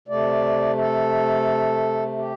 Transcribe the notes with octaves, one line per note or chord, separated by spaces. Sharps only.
C3 A3 D5
A4
G4